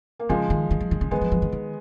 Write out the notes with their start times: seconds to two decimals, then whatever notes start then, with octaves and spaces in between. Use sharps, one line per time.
0.19 A#3
0.29 C#3 F3 G#3
0.50 D#3
0.71 D#3
0.81 F3
0.91 D#3
1.01 C#3
1.11 D#3 G#3 B3
1.21 F3
1.32 F3
1.42 D#3
1.52 D#3